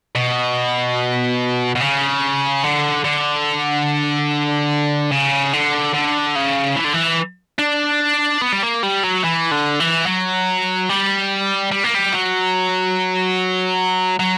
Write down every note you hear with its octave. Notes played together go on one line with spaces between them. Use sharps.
B2
B2
C#3
D3
D3
C#3
D3
D3
C#3
E3
D3
E3
D4
B3
G3
A#3
G3
F#3
E3
D3
E3
F#3
G3
G3
A#3
G3
F#3
F#3